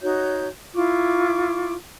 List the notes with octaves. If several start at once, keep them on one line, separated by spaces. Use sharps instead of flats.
D#4 F#4 C#5 G6
E4 F4 C#6 D6